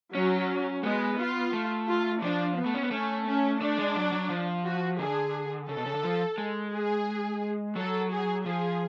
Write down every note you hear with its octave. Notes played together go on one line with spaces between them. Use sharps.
F#3 C#4
G#3 B3
F4
A3
F4
F3 D4
B3
A3
C#4
B3
A3 C#4
C#4
A3 D4
G#3
F#3
F#3
F3
F#4
D3 G#4
C#3 A4
B2
C#3
D3
F3
G#3
G#4
F#3 A4
G#4
F3 G#4